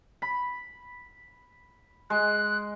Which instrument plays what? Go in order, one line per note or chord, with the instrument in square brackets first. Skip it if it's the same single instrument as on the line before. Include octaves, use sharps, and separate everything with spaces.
[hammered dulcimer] B5
[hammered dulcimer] G#3 [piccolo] F#6